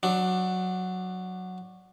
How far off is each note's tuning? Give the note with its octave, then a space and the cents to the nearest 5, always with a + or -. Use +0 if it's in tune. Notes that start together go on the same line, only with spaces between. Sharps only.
F#3 -5 D4 +20